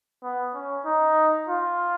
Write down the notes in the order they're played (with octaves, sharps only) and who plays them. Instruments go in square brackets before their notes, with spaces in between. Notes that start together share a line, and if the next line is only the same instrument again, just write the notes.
[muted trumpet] B3
C#4
D#4
F4